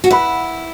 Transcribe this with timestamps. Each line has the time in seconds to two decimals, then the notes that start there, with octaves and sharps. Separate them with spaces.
0.04 F#4
0.10 E4 B4 F#5 B5